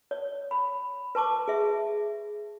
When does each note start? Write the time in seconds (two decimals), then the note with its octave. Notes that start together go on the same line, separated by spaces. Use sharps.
0.11 C#5
0.51 B5
1.15 B4 A5 C#6 D6
1.48 G#4 E5